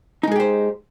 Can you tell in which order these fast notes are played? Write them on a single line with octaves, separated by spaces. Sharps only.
D#4 G#3 G#4 G4 C5